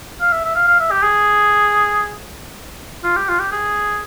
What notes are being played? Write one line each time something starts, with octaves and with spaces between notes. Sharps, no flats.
F5
E5
E5
F5
F5
E5
G4
G#4
F4
G4
F4
G4
G#4